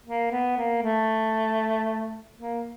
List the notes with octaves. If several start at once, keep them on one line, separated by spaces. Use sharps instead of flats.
A#3
B3
A#3
A3
A#3